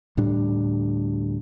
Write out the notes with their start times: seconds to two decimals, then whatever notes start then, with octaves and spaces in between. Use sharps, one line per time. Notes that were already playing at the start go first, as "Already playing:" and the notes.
0.17 D2 A2 G3 D4